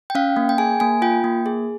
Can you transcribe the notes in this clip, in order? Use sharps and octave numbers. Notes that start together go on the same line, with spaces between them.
G5
C#4 F5
A#3
G5
G#4 G#5
A#3 G#5
F4 G5
A#3
G#4